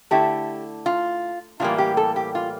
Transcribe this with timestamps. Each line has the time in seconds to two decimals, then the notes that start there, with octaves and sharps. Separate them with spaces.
0.11 D3 A3 E4 G4
0.86 F4
1.60 A2 E3 G3 A#3 F4
1.78 G4
1.97 A4
2.16 G4
2.35 F4